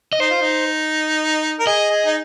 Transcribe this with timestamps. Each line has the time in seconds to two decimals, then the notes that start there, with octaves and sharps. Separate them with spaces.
0.13 D#5
0.20 D#4 C5
0.31 F4
0.41 D#4
1.59 A#4
1.67 G#4 D#5
1.91 G#4
2.06 D#4